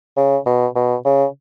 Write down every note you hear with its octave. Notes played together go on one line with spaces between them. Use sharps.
C#3
B2
B2
C#3